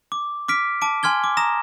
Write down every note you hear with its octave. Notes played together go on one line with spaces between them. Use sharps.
D6
D6 F6 B6 D7
A5 D6 D7
G#5 C6 F6 G#6 G7
D6
A#5 D#6 A#6 E7